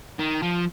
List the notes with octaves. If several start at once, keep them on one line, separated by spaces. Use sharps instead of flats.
D#3
F3